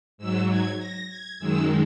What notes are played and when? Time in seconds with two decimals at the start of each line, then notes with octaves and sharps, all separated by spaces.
0.18 G#2 F#3 E6
0.49 G#6
0.78 A#6
1.09 G#6
1.39 F#2 D#3 G#3 E6